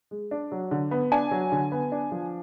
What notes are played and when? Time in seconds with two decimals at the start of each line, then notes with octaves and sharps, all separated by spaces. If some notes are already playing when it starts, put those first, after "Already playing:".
0.11 G#3
0.31 D4
0.52 F#3
0.71 D3
0.91 B3
1.12 D4 G#5
1.31 F#3
1.52 D3
1.72 B3
1.92 D4
2.12 F3